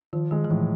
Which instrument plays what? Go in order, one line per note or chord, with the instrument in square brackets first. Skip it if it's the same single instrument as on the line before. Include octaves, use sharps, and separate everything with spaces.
[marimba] D#3 [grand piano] F3
[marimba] D#3 [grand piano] G#3
[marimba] E3
[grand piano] A2 [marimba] F3